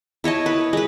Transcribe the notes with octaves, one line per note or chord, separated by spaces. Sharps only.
E4 C#5 D#5 A5
B4
G#3 B4